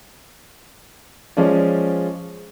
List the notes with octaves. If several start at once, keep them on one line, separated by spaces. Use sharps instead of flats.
F3 G#3 C#4 D5